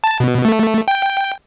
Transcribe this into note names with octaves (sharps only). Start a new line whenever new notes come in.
A5
B2
A3
G5